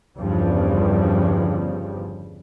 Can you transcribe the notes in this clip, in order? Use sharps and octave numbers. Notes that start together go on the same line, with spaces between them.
G1 E2 G2 C#3 F3 G3